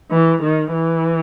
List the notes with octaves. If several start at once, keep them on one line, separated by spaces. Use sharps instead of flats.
E3
D#3
E3